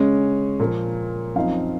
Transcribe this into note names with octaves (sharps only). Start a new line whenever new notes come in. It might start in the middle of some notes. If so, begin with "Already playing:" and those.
Already playing: C#3 G#3 C#4 C#5
A#2 F3 A#3
F#2 F3 C4 D#4 F5